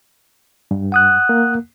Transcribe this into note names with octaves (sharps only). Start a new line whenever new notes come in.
G2
F#5 D#6 F#6
A#3